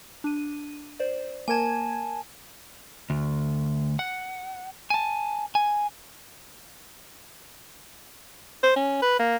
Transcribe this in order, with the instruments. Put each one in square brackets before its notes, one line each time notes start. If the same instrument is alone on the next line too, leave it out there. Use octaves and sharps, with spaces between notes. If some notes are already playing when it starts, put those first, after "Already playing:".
[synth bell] D4 D#7
C5 D5
[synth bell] A#3 A#4 G#6 [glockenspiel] G#5 A5
[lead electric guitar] D2
F#5
G#5 A5
G#5
[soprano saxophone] C5
C#4
B4
A#3